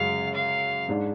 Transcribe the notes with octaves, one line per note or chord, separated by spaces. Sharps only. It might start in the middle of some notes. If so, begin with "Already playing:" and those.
Already playing: F#2 C#3 G#3 F5
F5
G#2 G#3 D4